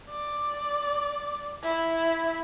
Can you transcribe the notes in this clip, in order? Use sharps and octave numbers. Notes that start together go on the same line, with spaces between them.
D5
E4